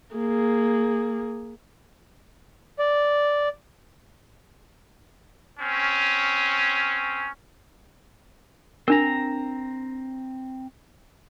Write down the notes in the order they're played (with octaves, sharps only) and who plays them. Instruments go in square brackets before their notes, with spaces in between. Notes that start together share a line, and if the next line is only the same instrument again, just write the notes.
[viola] A#3 G#4
[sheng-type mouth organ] D5
[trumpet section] C4 C#4
[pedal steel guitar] C4 A#5 [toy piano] D4 A#4